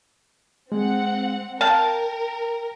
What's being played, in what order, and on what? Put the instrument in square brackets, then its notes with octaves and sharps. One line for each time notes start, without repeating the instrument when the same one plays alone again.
[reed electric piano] G#3 [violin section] C4 F#5
[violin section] A#4 [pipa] F5 A5 [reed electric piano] G5